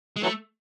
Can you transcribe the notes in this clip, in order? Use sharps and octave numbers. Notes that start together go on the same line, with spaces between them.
G#3
E3 F#3 A3